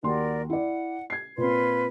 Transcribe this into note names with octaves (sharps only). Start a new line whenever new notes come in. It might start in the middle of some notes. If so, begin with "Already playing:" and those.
D#2 F#4 A#4 D5 C6
E4 D5 F#5
G#6 C7
A#2 C4 F4 B4 C6